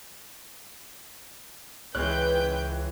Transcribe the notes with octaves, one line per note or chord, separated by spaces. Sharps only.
C#2 E3 G#3 B4 C#5 G5 F#6 G6